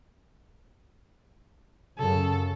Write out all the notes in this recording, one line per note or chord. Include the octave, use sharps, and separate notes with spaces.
F#2 C#3 A4